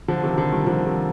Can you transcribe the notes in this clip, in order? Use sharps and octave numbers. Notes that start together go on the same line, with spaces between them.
D3 F3
C3 D#3
D3 F3
D#3 G3
D3 F3
C3 D#3